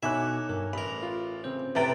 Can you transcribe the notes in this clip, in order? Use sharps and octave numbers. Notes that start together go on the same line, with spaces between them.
B2 D#4 A4 C#5 E5 G#5 D6 F#6
G2 A#4
A1 A#4 B5
F4
C#3 C4 C5 G6
A2 C3 B4 G5 A#5 A6